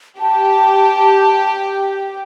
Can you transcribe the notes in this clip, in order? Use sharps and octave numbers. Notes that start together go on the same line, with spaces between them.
G4 A5